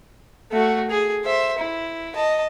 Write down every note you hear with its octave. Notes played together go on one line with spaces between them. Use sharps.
A3 F#4
G#4
C5 E5
E4
D#5 A5